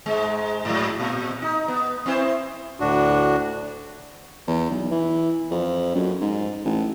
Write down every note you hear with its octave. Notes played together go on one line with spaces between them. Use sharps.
G#2 G#3
G#2 F#3
A#2
D#4
B3
C4 E4 C5
D2 A2 D4 F#4
E2
B1
E3
F2
F#2
G#2
A1